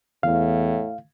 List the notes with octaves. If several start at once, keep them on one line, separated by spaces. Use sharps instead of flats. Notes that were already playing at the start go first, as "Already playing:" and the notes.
E2 A2 F5